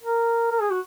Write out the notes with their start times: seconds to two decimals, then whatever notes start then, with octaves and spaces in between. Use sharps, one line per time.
0.03 A#4
0.51 A#4
0.61 G#4
0.70 F#4